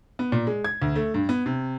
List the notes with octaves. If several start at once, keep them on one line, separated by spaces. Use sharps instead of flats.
B3
A#2
G#3
G#6
D2
A3
G2
B3
C3